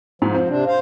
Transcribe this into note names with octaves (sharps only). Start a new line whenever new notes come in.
G#2 F3
C4
C3 D4
C5 F5